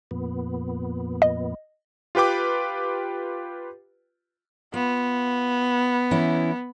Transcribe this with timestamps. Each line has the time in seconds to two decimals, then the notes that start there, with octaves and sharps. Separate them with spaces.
0.11 F2 A#2 B3
1.22 D#5
2.15 F4 G4 B4 G5 D6
4.74 B3 F4
6.11 E3 C#4 E4